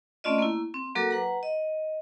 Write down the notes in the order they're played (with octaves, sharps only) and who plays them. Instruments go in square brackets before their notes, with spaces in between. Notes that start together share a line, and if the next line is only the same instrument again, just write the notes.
[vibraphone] A3 C4 C#4 F4 D5 D#5
A#3 E4
C4
F#3 A#3 F#4 A4 A#4 D6
B4 F#5 A#5
D#5